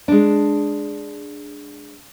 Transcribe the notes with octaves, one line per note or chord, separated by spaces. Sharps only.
G#3 D4